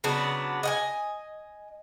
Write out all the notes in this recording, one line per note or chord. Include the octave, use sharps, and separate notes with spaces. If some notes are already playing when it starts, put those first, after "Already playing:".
C#3 F#3 B3 D4
D#5 F#5 G#5